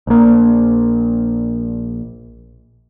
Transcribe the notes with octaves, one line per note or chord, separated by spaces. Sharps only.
A#1 A#3